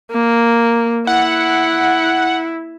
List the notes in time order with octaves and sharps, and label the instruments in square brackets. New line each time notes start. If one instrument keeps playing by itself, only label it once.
[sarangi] A#3
[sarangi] E4 [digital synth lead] F#5